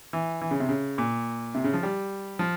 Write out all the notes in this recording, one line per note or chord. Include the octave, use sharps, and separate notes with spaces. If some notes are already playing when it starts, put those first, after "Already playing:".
E3
E3
C#3
C3
C#3
A#2
C3
C#3
F3
G3
F3